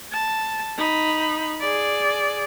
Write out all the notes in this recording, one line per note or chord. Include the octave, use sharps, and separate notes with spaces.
A5
D#4 B5
G#4 D5